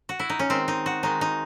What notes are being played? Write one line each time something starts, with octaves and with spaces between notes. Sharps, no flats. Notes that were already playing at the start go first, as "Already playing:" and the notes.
F#4
E4
D#4
C#4
D#3 G#3 C4
D#4
F#4
D#3 G#3 D#4
D#4